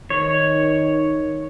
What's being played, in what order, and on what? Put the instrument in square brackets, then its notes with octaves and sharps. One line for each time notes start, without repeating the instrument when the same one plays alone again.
[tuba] D#3 [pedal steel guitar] C#5